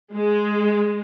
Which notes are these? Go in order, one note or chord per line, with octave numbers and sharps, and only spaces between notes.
G#3